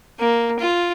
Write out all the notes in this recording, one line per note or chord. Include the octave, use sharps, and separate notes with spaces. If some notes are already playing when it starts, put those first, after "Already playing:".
A#3
F4